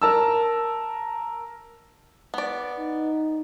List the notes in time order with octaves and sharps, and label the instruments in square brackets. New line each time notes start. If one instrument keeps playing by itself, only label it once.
[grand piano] A#4 A5 E6
[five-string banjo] B3 D5
[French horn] D#4